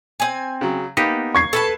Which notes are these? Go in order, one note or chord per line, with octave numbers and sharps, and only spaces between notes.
C4 G#5
C#3 F#3
A#3 B3 D#4 G4
C#6 G#6 C7
A4 B4 A5